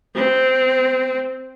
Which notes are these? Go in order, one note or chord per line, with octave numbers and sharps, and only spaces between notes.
C4